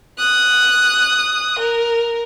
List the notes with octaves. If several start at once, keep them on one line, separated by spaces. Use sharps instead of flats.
D#6 F#6
A#4